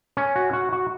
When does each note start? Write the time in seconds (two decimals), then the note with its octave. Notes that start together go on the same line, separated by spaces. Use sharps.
0.17 C#4
0.36 F#4
0.53 F#4
0.72 F#4